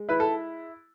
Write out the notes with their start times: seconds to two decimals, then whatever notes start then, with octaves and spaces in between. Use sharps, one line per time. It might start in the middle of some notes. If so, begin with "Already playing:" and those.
Already playing: G#3
0.09 E4 B4
0.20 A4